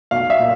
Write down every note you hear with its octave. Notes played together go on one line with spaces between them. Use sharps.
B1 F5
E5
A#2